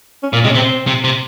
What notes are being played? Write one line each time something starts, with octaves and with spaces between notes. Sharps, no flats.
C#4
A#2 A#3
C3 G#3
C#4
C3 C4
C3
C3